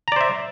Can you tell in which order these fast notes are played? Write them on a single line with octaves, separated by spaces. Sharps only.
A#5 D5 C5 E5